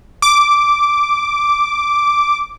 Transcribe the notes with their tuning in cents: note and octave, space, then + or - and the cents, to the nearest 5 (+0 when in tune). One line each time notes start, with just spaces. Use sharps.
D6 -5